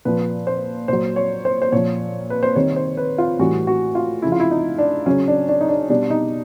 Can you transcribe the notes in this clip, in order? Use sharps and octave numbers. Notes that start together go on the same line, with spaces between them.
A#2 F3 B4
C5
A#2 F#3 C5
C#5
C5
C5
A#2 F3 C#5
B4
C5
C3 D#3 G3 C#5
C5
B4
F4
A2 E3 G3 F#4
F#4
F4
C#3 F3 E4
F4
E4
D#4
D4
C#3 F#3 C#4
D4
D4
D#4
D4
B2 G3 D4
D#4